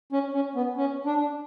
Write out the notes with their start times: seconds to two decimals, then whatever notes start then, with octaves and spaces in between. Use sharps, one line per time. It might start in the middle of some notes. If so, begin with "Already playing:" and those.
0.12 C#4
0.34 C#4
0.56 B3
0.77 C#4
1.06 D4